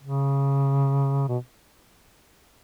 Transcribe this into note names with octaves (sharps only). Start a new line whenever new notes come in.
C#3
B2